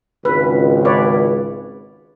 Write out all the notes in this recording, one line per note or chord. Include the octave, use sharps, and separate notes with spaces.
G#1 C#2 B4
B4 C#5 D5